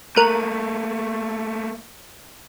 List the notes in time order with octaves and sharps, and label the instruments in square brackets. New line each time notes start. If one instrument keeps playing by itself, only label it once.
[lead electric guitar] A3 A#3 [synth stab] A#4 F#6 D#7